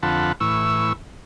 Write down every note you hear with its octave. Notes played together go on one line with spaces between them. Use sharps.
F2 D3 F4 F#5 A5 B5
A2 E3 C#6 E6